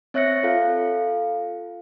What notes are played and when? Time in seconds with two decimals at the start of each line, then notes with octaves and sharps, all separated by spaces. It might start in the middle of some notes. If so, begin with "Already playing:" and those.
0.14 C4 C#5 E5 F#6 A#6 C#7
0.43 F4 A4 F5